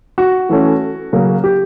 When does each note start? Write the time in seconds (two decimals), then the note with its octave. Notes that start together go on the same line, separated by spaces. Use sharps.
0.18 F#4
0.49 E3 A3 C#4
1.13 C#3 F#3 A#3 C#4
1.44 G4